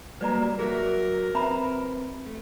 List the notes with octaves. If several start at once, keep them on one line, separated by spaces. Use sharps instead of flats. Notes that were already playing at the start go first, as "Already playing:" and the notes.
F#3 G3 A#3 B4 D5 A#5
F#3 F#4 G#4 A#4 E5
C4 B4 E5 A#5 B5
A3